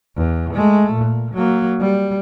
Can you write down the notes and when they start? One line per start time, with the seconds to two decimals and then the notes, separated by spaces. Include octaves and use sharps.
0.16 E2
0.54 G#3 A3
0.93 A#2
1.34 F#3 A#3
1.80 G3